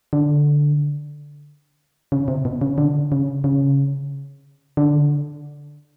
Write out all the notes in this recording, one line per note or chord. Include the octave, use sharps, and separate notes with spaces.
D3
C#3
C3
B2
C#3
D3
C#3
C#3
D3